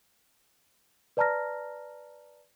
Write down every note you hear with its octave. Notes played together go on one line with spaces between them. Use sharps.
B4 D5 A5 A#5 F6 A#6